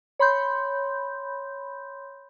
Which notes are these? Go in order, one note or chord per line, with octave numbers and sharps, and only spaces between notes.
C#5 B5 C6 G6